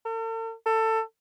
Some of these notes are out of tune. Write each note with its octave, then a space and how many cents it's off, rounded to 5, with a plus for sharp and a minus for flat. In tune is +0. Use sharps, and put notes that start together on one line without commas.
A4 +45
A4 +20